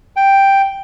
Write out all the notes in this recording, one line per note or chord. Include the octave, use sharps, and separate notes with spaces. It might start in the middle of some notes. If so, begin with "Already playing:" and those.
G5